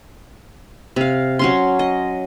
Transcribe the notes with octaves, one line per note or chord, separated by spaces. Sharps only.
C3 F5
F#3 C#4 C6
D#5